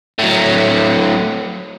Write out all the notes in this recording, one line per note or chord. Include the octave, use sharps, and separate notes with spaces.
A2 F#3